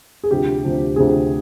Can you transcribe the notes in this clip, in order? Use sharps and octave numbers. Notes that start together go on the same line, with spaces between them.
G#4
D2 C3 F3 G4
D2 C3 F3
D2 C3 F3 G#4